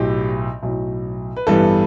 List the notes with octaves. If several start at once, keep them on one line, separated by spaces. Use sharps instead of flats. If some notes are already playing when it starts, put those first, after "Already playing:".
Already playing: B1 A2 F#3 G4
B1 A2 F#3
B4
A1 G2 E3 G3 B3 A4